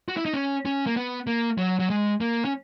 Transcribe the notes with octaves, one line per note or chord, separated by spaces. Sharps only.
F#4
E4
D#4
C#4
C#4
A#3
B3
A#3
F#3
F#3
G#3
A#3
C#4